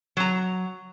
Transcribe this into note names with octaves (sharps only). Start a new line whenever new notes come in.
F#3 A#5